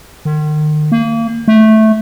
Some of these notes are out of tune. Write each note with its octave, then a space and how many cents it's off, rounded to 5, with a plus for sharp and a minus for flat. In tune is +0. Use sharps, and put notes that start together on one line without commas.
D#3 -40
A#3 -30
A3 -10